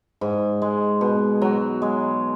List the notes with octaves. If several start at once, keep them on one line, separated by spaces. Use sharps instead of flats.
G#2
G#3
B2
F#3
G#3